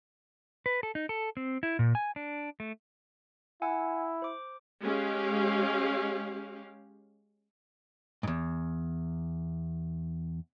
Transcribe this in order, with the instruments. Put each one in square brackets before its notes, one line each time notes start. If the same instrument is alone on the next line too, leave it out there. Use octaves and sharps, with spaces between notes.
[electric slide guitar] B4
A4
D#4
A4
C4
E4
A#2
G#5
D4
A3
[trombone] E4 [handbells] F#5 G#5 E6
[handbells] C5 D6
[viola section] G#3 C#4 G4 F5
[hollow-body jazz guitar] E2 G#2